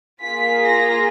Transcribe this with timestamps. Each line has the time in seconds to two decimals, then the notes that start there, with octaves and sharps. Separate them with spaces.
0.22 A#3 F4 G#4 B6
0.64 A#6